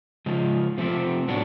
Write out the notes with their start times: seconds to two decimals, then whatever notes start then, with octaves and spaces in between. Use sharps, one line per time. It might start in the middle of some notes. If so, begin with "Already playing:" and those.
0.26 C#3 F3 G#3
0.78 C3 F3 A3 C4
1.28 A2 F#3 B3 D4